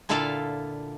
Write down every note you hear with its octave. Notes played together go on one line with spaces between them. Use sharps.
A#2 D3 E4 F4 A4 F5